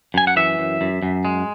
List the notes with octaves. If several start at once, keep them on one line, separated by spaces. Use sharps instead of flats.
F#2 G#5
F#5
E3 E5
F#2
F#2
F#2
G#3